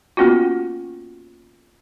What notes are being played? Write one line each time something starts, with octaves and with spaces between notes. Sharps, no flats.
A#3 B3 C#4 F4 F#4